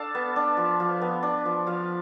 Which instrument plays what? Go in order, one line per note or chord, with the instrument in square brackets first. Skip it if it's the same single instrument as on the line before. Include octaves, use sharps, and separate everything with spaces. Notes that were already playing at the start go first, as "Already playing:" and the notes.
Already playing: [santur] D4 A4 F5 A5
B3
D4
F3
F3
B3
D4
F3
F3 F5